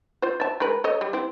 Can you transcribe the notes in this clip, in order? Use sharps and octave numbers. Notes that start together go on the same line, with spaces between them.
F4 C5
E5 A5
G#3 A#4 B4
A4 C#5 D#5
G3
C4 E4